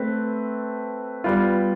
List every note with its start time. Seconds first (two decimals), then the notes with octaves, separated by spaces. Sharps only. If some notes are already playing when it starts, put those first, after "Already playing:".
Already playing: A3 C4 B4
1.24 G3 B3 F4